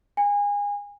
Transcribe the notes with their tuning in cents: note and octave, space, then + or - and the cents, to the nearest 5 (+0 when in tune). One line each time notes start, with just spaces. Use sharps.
G#5 -30